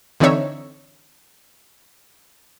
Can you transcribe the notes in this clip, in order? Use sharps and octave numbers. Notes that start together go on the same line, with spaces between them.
D3 E3 C4 D#4 C#5 E5